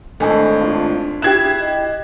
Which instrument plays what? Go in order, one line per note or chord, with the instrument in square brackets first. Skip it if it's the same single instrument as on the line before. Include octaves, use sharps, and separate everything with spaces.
[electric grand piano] G#1 A2 [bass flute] D4 [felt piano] A4 D#5 G#5
[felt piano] F4
[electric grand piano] E4 [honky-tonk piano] G4 G#6 E7 [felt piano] F#6 C7
[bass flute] D#5